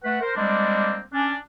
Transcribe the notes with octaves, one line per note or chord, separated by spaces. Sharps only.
A3 B4 F#5
A#4 C5
G3 G#3 A#3 C4 D4
C#4 D4